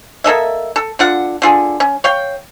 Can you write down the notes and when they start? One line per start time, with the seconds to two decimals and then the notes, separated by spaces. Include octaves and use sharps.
0.24 A#3 A4 D#5 E5
0.76 A4
0.99 D3 F4 F#5
1.42 D3 F4 G#4
1.80 C#4
2.04 C#5 F5 G5